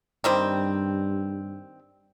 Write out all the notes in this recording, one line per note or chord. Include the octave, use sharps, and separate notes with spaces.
G2 D#3 G3 C4